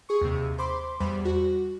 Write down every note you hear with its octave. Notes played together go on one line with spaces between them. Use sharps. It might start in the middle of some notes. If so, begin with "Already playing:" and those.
G#4 C#6
D#2 C3
C5 B5 C6 D6
E2 G3 C5 B5
F#4